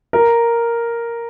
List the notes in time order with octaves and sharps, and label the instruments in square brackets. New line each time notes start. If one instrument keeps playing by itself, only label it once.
[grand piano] A#4